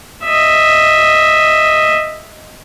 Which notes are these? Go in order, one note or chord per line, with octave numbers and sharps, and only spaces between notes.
D#5 E5